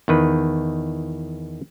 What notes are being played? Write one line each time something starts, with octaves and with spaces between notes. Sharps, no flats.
E2 D#3 B4